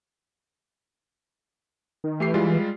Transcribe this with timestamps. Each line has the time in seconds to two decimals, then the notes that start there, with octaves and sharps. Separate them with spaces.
2.04 D#3
2.20 E3 A3 G4 C7
2.34 G3 G#3 F4